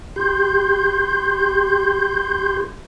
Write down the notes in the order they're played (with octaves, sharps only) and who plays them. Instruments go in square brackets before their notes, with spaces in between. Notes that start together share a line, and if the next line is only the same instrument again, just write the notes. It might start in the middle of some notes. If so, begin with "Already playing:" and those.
[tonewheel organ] G4 C6 G6